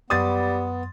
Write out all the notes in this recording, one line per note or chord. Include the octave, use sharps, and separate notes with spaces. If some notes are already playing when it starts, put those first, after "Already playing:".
F#2 G3 B3 C6 D#6 A6